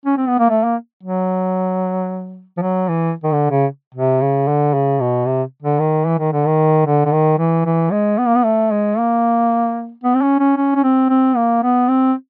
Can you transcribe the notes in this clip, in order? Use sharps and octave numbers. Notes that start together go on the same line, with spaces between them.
C#4
C4
B3
A#3
A3
A#3
F#3
F3
F#3
E3
D#3
D3
C#3
C3
C#3
D3
C#3
B2
C3
D3
D#3
E3
D#3
D3
D#3
D3
D3
D#3
E3
E3
G#3
B3
A#3
B3
A3
G#3
A#3
B3
C4
C#4
C#4
C#4
C#4
C4
C4
A#3
B3
C4